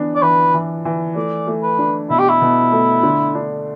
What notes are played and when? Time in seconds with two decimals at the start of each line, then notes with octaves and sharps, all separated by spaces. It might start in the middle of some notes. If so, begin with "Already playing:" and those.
Already playing: E3 B3 D4
0.16 D5
0.22 E3 B4
0.54 E3
0.85 E3
1.16 A3 D5
1.47 A3
1.63 B4
1.79 D4
2.10 B2 E4
2.19 G4
2.29 E4
2.41 B2
2.72 A3
3.03 D3
3.35 D4